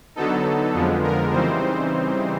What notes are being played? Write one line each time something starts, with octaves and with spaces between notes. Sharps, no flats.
D3 F#3 B3 D#4 A4
F2 D3 F3 G#3 B3
A#4
C#3 E3 G3 C4 D#4 C5